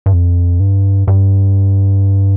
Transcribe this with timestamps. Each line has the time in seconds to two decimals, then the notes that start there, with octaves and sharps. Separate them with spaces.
0.06 G2
0.13 F2
0.60 G2
1.07 G2